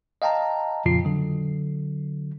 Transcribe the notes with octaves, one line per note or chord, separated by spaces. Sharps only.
D#5 F5 G5 A5 A#5
F2 A#2 C#3 F3 F4 C7
D3 F#3